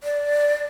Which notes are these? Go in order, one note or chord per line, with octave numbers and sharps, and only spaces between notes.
D5